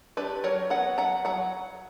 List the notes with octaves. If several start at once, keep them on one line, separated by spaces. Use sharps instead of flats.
D4 G4 B4
F#3 A#4 C#5
B3 F#5 A#5
F#3 F#5 A#5
F#3 F#5 A#5